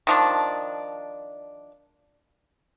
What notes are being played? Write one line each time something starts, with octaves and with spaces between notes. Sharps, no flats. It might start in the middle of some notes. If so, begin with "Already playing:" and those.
D#3 F3 D4